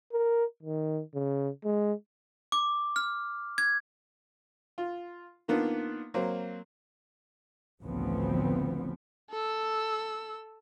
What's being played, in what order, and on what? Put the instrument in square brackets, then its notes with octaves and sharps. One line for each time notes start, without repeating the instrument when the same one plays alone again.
[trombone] A#4
D#3
C#3
G#3
[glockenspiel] D6
F6
G#6
[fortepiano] F4
D#3 A#3 B3 D4 F4
F#3 A#3 C4
[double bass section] A1 D2 C#3 F3 B3 C4
[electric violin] A4 E6